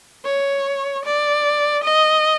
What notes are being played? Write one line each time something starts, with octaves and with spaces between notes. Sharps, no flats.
C#5
D5
D#5